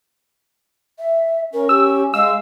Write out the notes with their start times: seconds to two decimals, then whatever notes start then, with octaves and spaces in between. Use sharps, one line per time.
0.99 E5
1.53 C#4 A#4
1.69 G4 E6
2.14 G#3 F5 E6